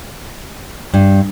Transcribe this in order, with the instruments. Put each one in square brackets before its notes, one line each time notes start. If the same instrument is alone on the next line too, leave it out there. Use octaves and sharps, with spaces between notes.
[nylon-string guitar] G2